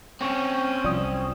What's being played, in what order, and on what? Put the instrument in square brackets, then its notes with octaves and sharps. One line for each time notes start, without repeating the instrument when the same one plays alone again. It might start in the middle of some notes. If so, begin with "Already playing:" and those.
[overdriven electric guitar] C4 C#5 [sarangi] C#4
[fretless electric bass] C2 F3 F#3 [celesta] D5 D#6